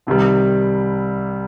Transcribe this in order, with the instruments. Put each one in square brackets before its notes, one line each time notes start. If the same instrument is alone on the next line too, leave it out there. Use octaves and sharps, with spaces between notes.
[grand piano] C2 C3 D#3 G3